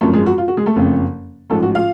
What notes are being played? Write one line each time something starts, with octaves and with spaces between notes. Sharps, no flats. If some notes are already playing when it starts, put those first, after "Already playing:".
G#1 F#2 F3 A3 A4
G#3 G#4
F#4
F4
F#4
G#3 G#4
A3 A4
F#1 F2 C#3 F3
A1 G#2 F3 A3 A4
F#4
F4 F5